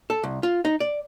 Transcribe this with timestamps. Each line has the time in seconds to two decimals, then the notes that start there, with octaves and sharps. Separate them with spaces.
0.10 A4
0.23 C2
0.43 F4
0.65 D#4
0.80 D5